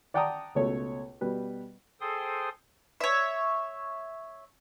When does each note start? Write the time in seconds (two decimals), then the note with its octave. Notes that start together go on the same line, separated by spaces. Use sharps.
0.14 D5 F#5 G5 A5 A#5 D#6
0.55 C#2 B2 A3 C#5
1.21 B2 G3 B4
2.01 G#4 A4 C5 G5 C6 D#6
3.00 C#5 E5